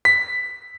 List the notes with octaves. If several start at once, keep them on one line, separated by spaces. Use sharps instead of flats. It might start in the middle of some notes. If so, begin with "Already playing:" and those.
B6